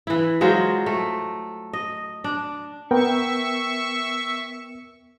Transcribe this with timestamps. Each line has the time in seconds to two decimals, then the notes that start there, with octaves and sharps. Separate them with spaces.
0.07 E3 E4
0.41 F#3 G#3 F4 C5
0.86 A3
1.73 D#5
2.24 D4
2.91 B3 A#4 E5 G5 C#6